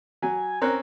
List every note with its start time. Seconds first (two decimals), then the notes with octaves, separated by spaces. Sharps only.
0.22 F#3 G#5
0.62 C4 C#4 A#4 F#6